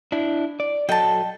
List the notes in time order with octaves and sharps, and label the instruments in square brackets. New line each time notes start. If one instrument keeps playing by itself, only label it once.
[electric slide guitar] D4 E4
D5
[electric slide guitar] F#3 A4 D#5 [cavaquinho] G5 A5